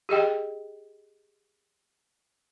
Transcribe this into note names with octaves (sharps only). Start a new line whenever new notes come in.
G4 G#4 D#5 G5